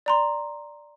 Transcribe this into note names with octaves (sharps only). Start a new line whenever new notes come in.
D5 A#5 C6